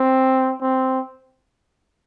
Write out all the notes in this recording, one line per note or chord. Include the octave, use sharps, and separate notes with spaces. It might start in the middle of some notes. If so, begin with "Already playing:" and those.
Already playing: C4
C4